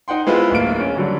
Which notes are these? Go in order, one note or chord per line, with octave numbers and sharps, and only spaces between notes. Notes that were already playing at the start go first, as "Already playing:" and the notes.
D#4 F#5 G5 C6
G#3 B3 C4 E4 F4 B4
D1 A#3 D7
C#4
D3 F#3 G3